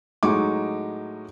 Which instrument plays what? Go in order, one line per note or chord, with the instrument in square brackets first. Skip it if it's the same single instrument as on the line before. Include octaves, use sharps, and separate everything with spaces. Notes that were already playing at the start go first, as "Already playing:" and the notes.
[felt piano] A2 F#3 G#3 D#4 C#6 D6